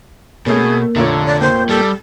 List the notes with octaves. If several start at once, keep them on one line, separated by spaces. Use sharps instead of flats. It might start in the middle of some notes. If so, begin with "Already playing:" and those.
B2 A3 A#3 C#4 G#4
F1 A#2 D3 A4 C#5
D5
A#3 C5 G5
G3 A4